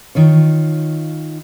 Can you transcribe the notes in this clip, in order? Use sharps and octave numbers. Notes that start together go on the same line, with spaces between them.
D#3 F4 C#5